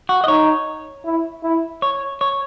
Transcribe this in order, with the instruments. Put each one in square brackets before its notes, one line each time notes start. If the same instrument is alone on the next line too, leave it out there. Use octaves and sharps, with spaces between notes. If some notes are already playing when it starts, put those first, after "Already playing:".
[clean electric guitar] F#4
D#5
[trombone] D#4 [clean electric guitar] C#5
[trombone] E4
E4
[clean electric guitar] C#5
C#5